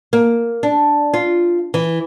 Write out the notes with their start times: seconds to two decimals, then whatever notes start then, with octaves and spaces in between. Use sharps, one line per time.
0.13 A#3
0.63 D4
1.14 F4
1.74 E3